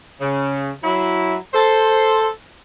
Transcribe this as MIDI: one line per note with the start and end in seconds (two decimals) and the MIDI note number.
0.20 0.71 49
0.84 1.36 54
0.84 1.36 64
1.53 2.28 69
1.53 2.28 72